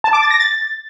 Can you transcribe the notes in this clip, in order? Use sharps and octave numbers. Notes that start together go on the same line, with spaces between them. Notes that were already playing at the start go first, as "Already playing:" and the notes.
A5
D6
A6
A#6
A6